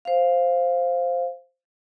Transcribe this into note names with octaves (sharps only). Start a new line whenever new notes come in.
C5 F5